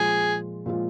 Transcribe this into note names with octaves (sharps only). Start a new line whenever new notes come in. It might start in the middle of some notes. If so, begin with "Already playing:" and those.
Already playing: A#2 F3 G#3 F4 G#4
A#2 F3 G#3 F4